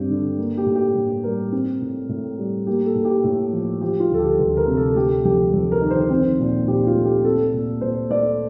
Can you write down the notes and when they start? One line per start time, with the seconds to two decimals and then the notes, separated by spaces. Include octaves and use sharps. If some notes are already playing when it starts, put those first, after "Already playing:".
Already playing: G2 C4 G4
0.10 D3
0.38 A#3
0.57 G4
0.66 A2
0.76 G4
0.95 A2
1.24 G3 A#4
1.52 C4
1.81 A2
2.09 A2
2.38 G3
2.67 A#3 G4
2.85 A4
2.95 A2
3.05 G4
3.24 A2
3.53 F3
3.81 F3 G4
4.00 F4
4.09 D2 A4
4.19 G4
4.39 D2 A4
4.57 A#4
4.68 C3
4.77 A4
4.95 A3 G4
5.25 F2 G4
5.53 F2 A4
5.72 A#4
5.81 D#3
5.90 C5
6.10 C4
6.39 A#2
6.67 A#2 G4
6.87 F4
6.95 A3
7.05 G4
7.24 C4 A4
7.54 A#2
7.81 A#2 C5
8.10 A3 D5